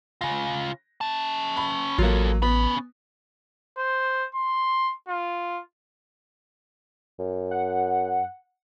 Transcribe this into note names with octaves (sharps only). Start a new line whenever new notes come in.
C#3 F4 A#6
C#4 A5
B5
A1 F#3 A#3 F4 A4
B3 C#4 B5
C5
C6
F4
F#2
F#5